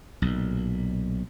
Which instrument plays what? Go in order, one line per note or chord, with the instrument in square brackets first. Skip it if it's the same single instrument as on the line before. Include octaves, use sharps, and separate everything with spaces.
[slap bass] B1 A#2